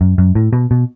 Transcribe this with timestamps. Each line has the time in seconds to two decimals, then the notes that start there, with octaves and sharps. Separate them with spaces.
0.01 F#2
0.18 F#2
0.35 A2
0.53 B2
0.71 B2